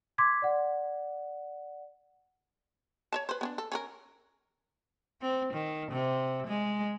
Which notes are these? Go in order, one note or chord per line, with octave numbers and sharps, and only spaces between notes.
C6 D6 G#6 B6
D5 F#5
C#5 E5 A5
B4 C5
B3 C#4 D4
A4
C#4 G#4 A#4
C4
D#3
C3
G#3